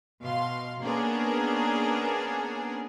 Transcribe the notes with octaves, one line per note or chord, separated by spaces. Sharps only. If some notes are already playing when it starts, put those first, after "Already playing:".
B2 F5 C6
A#3 B3 C#4 D4 G#4 A#4